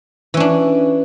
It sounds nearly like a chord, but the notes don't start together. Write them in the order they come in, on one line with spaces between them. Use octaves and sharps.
E3 C#4 D4